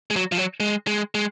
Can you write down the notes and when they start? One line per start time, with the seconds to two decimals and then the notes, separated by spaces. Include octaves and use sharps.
0.11 G#3
0.16 F#3
0.32 F3
0.38 F#3
0.60 G#3
0.87 G#3
1.15 G#3